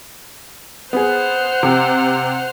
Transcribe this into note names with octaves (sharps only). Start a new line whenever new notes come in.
B3 G#4 C5 F#5 F6
C3 G4